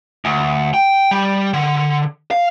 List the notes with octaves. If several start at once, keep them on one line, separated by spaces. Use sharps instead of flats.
D2
G5
G3
D3
F5